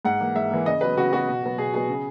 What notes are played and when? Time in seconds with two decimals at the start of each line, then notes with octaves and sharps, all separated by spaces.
0.05 G#2 F#5
0.20 E3 A#3
0.35 G#2 E5
0.51 E3 A#3
0.66 C#3 D#5
0.81 F#3 B3 B4
0.97 C#3 F#4
1.12 F#3 B3 F#4
1.28 B2
1.43 F#3 B3
1.58 B2 G#4
1.73 F#3 B3 G#4
1.89 C#3